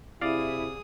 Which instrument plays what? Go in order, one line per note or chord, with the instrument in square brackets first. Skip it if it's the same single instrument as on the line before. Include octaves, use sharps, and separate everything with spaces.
[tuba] C3 [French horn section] E4 [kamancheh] G#4 D#6 [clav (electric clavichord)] D5 F5